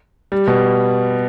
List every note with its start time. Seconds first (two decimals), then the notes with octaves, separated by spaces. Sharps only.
0.32 G3
0.47 B2